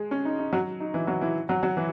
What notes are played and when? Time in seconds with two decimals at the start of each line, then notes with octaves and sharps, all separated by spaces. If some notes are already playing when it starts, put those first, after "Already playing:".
Already playing: G#3 G#4
0.11 C#4
0.25 D#4
0.39 D#4
0.53 F#3 F#4
0.80 D#4
0.94 E3 E4
1.07 F#3 F#4
1.21 E3 E4
1.49 F#3 F#4
1.63 F#3 F#4
1.77 E3 E4